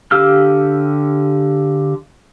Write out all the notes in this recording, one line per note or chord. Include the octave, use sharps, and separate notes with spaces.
D3 G4 F5 E6 F6